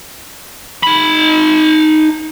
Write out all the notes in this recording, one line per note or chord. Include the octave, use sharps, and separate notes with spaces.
D#4 B5